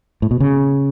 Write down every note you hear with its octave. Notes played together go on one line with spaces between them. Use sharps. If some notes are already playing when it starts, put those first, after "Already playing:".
A2
B2
C#3